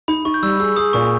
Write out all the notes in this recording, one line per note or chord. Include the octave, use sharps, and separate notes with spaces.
D#4 B5
D#4 C#6
G6
G3 E6
G#4 E6
G#4 D#6
A#2 C#6